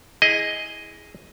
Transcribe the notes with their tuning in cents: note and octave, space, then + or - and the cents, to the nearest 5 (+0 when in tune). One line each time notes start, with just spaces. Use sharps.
E4 -15 G#4 +0 D#5 +5